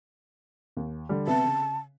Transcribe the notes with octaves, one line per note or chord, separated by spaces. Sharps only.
D#2
D3 G3
C3 B3 E5 A5
C#3